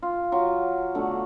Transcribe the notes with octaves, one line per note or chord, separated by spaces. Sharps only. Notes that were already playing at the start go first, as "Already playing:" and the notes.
F4
F#3 F4
B2 D3 A3